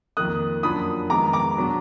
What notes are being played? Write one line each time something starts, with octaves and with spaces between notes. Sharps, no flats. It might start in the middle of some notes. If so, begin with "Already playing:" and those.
F2 D#3 A#3 D#6 F#6
F#2 F3 A#3 D4 B5 D#6
F2 D#3 G#3 B3 A#5 D6
A#5 D6
B2 F#3 B3 D4